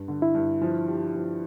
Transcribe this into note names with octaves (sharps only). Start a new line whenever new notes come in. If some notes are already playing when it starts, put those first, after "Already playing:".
Already playing: G2
D3
E4
G2
F3
G4
F3